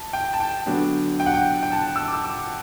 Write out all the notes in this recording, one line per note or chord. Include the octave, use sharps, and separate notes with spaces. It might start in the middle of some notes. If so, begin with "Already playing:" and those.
Already playing: A5
G5
A5
G5
D3 F#3 B3 D4
G5
F#5
G5
G5
A5
E6
D6
D6